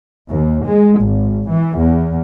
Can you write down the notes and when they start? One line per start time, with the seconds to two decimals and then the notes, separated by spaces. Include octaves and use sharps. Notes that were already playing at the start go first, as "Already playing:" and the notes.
0.28 D#2
0.65 G#3
0.99 G#1
1.49 E3
1.78 E2